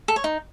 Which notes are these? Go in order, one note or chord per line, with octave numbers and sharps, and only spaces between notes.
A4
C#5
D#4